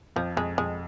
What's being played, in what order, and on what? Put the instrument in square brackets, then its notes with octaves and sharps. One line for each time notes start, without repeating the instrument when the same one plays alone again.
[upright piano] F2 [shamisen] F3
[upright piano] F2 [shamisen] G#3
[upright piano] F2 [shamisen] G#3